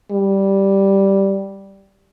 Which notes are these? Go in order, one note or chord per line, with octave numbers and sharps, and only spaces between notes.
G3